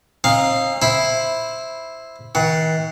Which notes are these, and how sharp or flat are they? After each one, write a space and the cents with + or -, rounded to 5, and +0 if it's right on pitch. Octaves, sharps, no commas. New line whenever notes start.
C4 +40 D#4 +0 F5 +0
E4 -5 C5 +0 B5 +0
D#3 +45 F#5 +0